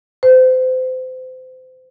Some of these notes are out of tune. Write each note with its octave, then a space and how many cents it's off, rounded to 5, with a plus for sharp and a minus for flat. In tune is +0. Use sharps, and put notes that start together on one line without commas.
C5 -30